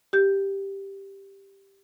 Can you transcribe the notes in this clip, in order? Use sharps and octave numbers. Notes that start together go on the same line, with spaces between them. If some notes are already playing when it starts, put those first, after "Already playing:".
G4 G6